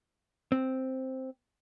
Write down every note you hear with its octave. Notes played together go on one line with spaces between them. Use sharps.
C4